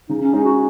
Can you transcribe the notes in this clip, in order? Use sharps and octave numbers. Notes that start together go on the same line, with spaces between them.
C#3 D#4
C#4
G#3 C#4 D#4 G#4
F#4